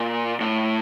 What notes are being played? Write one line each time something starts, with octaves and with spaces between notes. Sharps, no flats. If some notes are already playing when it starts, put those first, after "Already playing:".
Already playing: A#2
A2